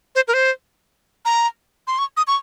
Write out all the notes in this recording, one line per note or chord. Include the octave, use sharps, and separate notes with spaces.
C5
A#4
C5
A#5
C6
C#6
D#6
C#6